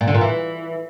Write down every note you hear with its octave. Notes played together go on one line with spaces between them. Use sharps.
A#2
D3
A#2
E3